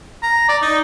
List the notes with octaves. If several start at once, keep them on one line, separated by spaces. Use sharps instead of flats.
A#5
D5
D#4